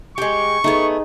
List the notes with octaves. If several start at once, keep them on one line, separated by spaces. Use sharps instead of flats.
G#3 G4 C#6
A3 B3 D#4 G#4